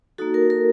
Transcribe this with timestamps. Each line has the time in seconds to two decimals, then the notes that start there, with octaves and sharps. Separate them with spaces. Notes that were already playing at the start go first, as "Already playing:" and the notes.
0.18 A#3 D#4 F#4 A4
0.34 A#4
0.50 A#4